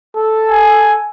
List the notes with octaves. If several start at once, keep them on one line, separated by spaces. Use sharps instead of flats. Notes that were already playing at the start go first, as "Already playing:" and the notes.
A4
G#5